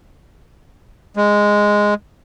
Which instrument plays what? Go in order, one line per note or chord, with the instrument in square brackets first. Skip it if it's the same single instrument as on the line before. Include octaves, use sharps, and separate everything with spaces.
[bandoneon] G#3